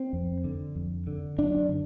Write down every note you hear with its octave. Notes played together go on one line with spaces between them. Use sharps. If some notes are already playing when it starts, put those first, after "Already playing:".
Already playing: C4
F2
D3
F2
D3
F#2 D4
D3